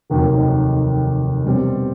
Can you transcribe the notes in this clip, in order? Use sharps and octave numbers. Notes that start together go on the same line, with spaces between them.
F1 D#2 D#3 F#3
B2 G3 C4